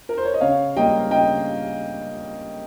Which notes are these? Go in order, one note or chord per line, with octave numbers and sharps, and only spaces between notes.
A#4
C5
C#5
D#5
C#3 C#5 F5
G3 A#3 D#5 G5
C#3 D#5 G5